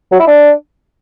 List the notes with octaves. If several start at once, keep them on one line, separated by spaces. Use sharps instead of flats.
F#3
E4
D4